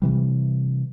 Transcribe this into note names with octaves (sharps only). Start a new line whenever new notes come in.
C3 E3 G3